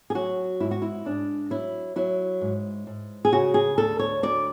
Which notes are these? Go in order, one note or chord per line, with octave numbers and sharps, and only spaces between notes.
G#4
F#3 F#4
G#2 E4
F#4
E4
G#2 D4
F#3 E4
F#3 E4
G#2
G#2
G#4
C#3 F#4
G#4
D2 A4
C#5
D2 D5